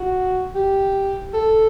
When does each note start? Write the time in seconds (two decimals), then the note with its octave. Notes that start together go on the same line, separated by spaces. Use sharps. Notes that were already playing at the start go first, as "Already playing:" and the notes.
Already playing: F#4
0.54 G4
1.34 A4